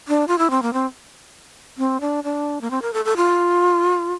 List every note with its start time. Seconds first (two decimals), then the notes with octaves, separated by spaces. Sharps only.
0.08 D4
0.28 F4
0.38 E4
0.50 C4
0.62 A#3
0.73 C4
1.78 C4
2.01 D4
2.24 D4
2.61 A#3
2.71 C4
2.82 A#4
2.93 A4
3.05 A4
3.17 F4